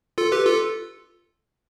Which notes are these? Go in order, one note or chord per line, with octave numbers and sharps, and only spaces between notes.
F4 A4
G4 B4
F4 A4